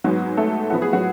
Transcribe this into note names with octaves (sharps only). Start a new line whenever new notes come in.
G#2 F#3 G#3 B3 F#4
A3 A4
A2 F3 B3 F#4
G#4
F#3 F#4